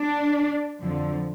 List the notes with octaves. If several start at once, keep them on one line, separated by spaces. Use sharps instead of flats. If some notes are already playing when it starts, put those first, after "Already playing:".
Already playing: D4
F2 D3 F3